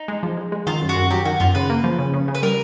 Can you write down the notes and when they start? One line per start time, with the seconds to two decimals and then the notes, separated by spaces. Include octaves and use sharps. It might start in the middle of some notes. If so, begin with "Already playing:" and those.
Already playing: D#4
0.08 G#3
0.23 F3
0.37 G#3
0.52 G#3
0.67 D#3 F4
0.82 F#2
0.89 F#4
0.96 F#2
1.11 F#3 G4
1.25 D#3 F#4
1.40 F#2 F4
1.55 C#3 B4
1.70 A#3
1.84 F3
1.99 C#3
2.14 C#3
2.28 C#3
2.35 B4
2.43 G3 A#4